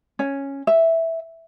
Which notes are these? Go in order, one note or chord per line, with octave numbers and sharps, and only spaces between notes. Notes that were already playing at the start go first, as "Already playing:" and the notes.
C#4
E5